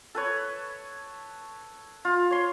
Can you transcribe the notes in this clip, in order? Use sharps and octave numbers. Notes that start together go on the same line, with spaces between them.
A4 B4 C#5
F4
C#5 C6